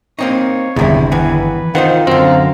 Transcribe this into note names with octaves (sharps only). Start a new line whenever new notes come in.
A#3 C4 D#4 C#5
G1 E2 C3 D#3 E4
D#3 E3 B3 B4
D#3 D#4 F4 C5 F#5
F#2 D3 F#3 C4 F5 A#5